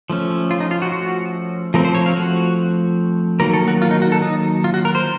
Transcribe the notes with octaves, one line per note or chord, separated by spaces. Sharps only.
F3 A3 C#4
F4
D#4
F4
F#4
F#4
F3 A3 C4 A#4
C5
C#5
F5
F#4
D#3 F#3 A#3 A#4
A4
F#4
F4
D#4
F#4
A4
D#4
F4
F#4
A#4
C5